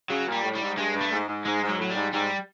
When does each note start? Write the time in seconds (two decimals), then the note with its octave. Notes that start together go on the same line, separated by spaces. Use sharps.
0.10 C#3 F#3
0.28 A#2 G3
0.44 A2
0.55 G3
0.61 G#2
0.77 G2 G#3
0.95 G2
1.01 A3
1.12 G#2
1.28 G#2
1.45 G#2 G#3
1.62 G#2
1.68 F#3
1.79 A2 F#3
1.90 G3
1.96 G#2
2.12 G#2 G3